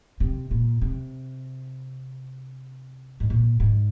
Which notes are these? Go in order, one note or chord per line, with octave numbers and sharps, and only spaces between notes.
C3
A#2
C3
G#2
A#2
G#2